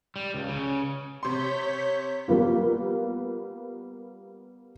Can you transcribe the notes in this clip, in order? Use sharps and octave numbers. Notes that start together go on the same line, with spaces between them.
G3
C#2
C#3
C3 C#5 C6 G6 B6
G3 A#3 B3 F4